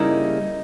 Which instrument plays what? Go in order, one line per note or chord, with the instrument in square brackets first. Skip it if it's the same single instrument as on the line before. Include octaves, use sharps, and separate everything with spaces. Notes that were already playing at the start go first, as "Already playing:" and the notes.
Already playing: [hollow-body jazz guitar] C#3 G3 A#3 E4 [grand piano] D#4